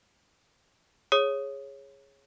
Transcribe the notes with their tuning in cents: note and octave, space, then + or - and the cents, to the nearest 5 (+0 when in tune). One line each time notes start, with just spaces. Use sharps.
G#4 +0 C#5 -10 D#6 +0